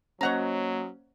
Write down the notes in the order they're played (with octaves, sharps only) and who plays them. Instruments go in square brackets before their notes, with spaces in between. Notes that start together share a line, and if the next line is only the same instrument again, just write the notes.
[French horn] F#3 [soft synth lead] A#3 [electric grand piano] C#4 C5 D#5 [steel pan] C#5 F#5 A#5